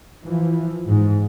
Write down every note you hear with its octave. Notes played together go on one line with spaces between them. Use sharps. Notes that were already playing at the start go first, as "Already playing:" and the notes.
E3 F3
G#2